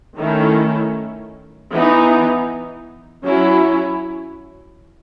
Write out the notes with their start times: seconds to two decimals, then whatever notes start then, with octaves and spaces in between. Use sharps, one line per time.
0.18 D#3 A3 C#4 E4
1.71 E3 B3 D#4
3.23 F#3 C#4 E4